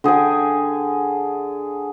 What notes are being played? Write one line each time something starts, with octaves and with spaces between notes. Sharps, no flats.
D3 G#4 G5 G#5